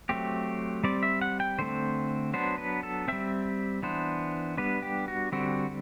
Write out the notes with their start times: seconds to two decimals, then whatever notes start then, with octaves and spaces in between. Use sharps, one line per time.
0.09 F#3 A3 C4 G4
0.84 G3 C4 D5
1.03 E5
1.21 F#5
1.40 G5
1.58 D3 A3 C4 C5
2.33 F#3 B3 D4 C5
2.58 B4
2.83 A4
3.08 G3 C4 E5
3.83 E3 B3 D4 C5
4.57 G3 B3 D4 B4
4.82 G4
5.08 F#4
5.32 D3 G3 C4 F#4